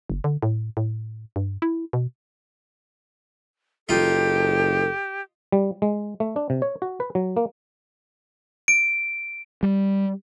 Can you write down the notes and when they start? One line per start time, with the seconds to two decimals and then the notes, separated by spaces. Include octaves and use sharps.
0.10 F#1
0.24 D3
0.42 A2
0.77 A2
1.36 G2
1.62 E4
1.93 B2
3.89 F#1 D#4 F4 G4 A4
5.52 G3
5.82 G#3
6.20 A3
6.36 D4
6.50 C3
6.62 C#5
6.82 F#4
7.00 B4
7.15 F#3
7.37 A#3
8.68 D7
9.63 G3